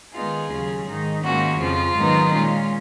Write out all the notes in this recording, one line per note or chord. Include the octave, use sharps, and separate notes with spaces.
D#3 G#3 B3 D#4 F4 G#4
D#2 C#3 F#3 C#4 F4
G#2 D#3 G#3 D#4
G#2 D#3 A#3 C#4 F4 F#4
F2 C#3 F3 F4
G#2 D#3 F#3 B3 D#4
A#2 G#3 C#4 F4